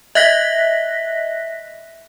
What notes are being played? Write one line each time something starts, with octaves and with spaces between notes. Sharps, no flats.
D#5 E5 F#6 A#6 B6